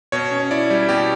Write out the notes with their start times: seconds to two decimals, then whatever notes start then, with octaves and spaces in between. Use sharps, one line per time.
0.12 B2 C#5
0.31 C#4
0.51 E4 D5
0.70 G3
0.88 B2 G4